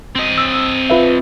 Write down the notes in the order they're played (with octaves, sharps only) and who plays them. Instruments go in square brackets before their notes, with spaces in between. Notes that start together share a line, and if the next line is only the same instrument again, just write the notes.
[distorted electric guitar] C4 D#5
[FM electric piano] E6
F4 B4 E5